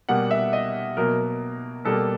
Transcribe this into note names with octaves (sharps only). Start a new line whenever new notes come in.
B2 G3 A#3 F#5
E5
D#5
B2 F#3 A#3 A#4
B2 G3 A#3 A4